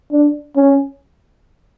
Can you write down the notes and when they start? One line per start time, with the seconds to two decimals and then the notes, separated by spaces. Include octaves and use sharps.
0.12 D4
0.56 C#4